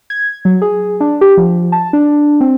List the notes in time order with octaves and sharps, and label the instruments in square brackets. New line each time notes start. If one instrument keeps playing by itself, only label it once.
[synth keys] G#6
F#3
G#4
D4
G4
F3
A5
D4
C4